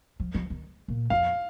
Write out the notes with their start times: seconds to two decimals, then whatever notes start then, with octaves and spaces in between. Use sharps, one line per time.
0.20 F3
0.35 F3
0.50 D#3
0.88 A#2
1.10 F2 F5